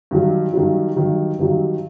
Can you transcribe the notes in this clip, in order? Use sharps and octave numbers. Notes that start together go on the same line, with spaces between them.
G2 D#3 F#3
G2 D#3 F#3
G2 D#3 F#3
G2 D#3 F#3